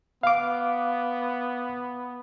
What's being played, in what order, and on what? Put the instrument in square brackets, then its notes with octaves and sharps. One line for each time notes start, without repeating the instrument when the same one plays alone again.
[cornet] B3 [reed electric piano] F5 D6